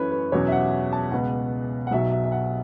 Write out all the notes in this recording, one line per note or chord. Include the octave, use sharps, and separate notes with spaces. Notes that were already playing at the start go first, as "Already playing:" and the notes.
Already playing: F#2 E3 A3 C#4 B4 C#5
B4
E2 B2 F#3 C#4 C#5
E5
F#5
A5
C#2 B2 B3 F#5
F#5
B1 B2 F#3 E5
E5
E5
F#5